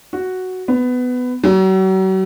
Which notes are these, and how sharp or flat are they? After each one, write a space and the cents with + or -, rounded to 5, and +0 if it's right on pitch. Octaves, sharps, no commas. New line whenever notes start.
F#4 +0
B3 +15
F#3 +40